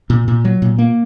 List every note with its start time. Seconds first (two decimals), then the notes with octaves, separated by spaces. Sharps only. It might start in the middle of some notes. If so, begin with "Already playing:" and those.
0.10 A#2
0.28 A#2
0.45 F#3
0.62 A#2
0.79 A#3